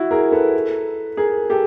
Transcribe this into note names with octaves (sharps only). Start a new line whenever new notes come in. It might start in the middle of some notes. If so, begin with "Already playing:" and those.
Already playing: E4 F#4
G#4 A#4
A4 B4
G#4 A#4
G4 A4